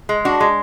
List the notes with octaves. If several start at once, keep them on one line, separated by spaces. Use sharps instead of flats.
G#3
D4 F#4
G#3